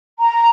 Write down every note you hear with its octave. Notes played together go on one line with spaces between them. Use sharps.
A#5